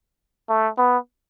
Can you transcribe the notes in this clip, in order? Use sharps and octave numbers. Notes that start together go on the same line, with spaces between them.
A3
B3